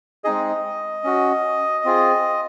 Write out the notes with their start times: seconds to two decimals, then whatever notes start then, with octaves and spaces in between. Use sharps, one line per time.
0.24 G#3 C4 D#4 G#4 D#5
1.04 C#4 F#4
1.85 C4 F4 G#4